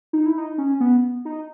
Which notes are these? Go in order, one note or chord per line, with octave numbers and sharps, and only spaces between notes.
D#4
E4
D#4
C#4
B3
D#4